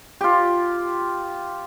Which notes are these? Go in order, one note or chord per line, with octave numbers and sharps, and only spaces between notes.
F4 G4